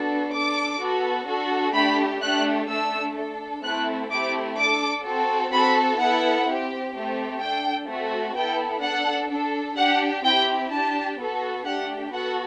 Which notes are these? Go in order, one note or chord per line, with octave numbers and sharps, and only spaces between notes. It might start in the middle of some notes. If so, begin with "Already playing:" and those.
Already playing: B3 D4 F#4 A4
D4 A4 D6
B3 F#4 A4
D4 F#4 A4
A3 D4 G4 B5
A3 D4 G4 F#6
A3 D4 A4 E6
D4 A4
A3 C4 E4 A4 F#6
A3 C4 E4 G4 D6
D4 A4 D6
C4 F#4 A4
C4 F#4 A4 B5
B3 E4 A4 F#5
C4 G4
A3 C4 G4
D4 A4 G5
A3 C4 F#4 A4
B3 E4 A4 G5
D4 A4 F#5
D4 A4
D4 G4 F#5
C4 E4 G4 G5
D4 G4 A5
B3 F#4 A4
A3 D4 G4 F#5
B3 F#4 A4 F#5